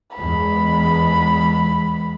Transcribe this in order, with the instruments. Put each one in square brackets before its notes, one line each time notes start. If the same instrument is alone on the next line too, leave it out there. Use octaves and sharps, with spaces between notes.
[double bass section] E2 G#3 [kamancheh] B5